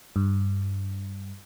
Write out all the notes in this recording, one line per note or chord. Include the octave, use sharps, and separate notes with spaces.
G2